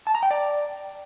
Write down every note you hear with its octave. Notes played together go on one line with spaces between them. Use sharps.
A5
A#5
G5
D5